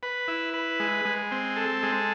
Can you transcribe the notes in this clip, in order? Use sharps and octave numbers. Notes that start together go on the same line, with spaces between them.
B4
E4
B4
G#3
G#3
C4
A4
G#3